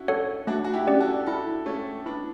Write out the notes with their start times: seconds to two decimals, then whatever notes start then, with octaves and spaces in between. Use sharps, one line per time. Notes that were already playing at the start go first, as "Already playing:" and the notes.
Already playing: C#4 D4 E4 F#4
0.08 A4 C#5 F#5
0.47 A3 D4 F#4
0.64 F#4
0.74 E4 G4
0.87 C#4 G4 D5
1.00 F#4 A4
1.26 E4 F#4 A4
1.66 A3 C#4 A4 C#5
2.05 B3 D4 E4